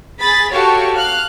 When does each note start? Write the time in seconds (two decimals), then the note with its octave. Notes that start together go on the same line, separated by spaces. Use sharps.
0.20 G#4 B5 A6 B6
0.52 F#4 G4 A4 C#5 F5 C#6
0.95 F5 F6 F#6